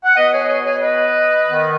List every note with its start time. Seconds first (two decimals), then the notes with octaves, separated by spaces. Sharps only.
0.05 F#5
0.16 B2 B3 B4 D#5
0.32 G#4 C#5
0.48 G#4 C#5
0.64 G#4 C#5
0.80 B4 D#5
1.45 D#3 B3